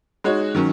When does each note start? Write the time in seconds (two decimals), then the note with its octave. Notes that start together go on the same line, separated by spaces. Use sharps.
0.24 G#3 D#4 F#4 C#5
0.55 D#3 F#3 C#4